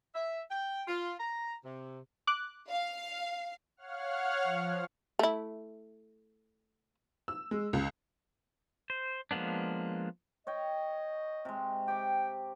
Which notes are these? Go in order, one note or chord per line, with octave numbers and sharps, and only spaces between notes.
E5
G5
F4
A#5
C3
D6 F#6
F5
C#5 F5 F#5 F6
F3
A3 E4
E6
G#3
C#2
C5
F3 G#3 A#3 B3 D4
C#5 D#5 G5
C3 G#3
G4 G5 D6